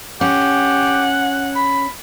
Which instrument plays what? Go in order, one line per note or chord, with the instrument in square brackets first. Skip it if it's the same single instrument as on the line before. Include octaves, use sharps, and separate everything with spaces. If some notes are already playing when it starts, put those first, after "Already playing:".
[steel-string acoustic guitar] C#4 [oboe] G4 [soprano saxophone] F#5
[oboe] B5